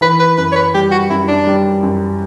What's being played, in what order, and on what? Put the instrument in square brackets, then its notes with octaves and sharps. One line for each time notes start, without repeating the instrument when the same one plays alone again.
[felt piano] E3 [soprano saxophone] B4
[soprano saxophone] B4
[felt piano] F#2 [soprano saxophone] B4
[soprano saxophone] C#5
B4
[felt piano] G3 [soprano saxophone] G4
[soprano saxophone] F#4
[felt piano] F#2 [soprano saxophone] E4
[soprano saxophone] D4
[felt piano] G3
F#2